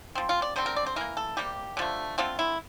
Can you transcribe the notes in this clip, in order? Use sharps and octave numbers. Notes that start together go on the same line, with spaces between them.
F3 C4
F4
D5
D3 G3 C4 C5
A#4
D5
C5
E3 A#3 A#4
A4
C3 G3 A#3 G4
D3 F3 A3
D3 A3 C4 F4
E4